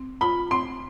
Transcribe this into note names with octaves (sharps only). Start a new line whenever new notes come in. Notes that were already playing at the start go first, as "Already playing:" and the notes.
Already playing: C4
F4 B5
C4 C6